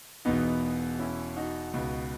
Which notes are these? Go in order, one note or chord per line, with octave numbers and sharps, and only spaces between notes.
E1 E2 B2 B3 D#4
C#4 E4
D#4 F#4
C#2 B2